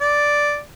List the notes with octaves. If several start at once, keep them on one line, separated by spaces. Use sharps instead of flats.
D5